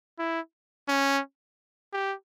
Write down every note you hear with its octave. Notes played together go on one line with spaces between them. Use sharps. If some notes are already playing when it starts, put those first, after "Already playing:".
E4
C#4
G4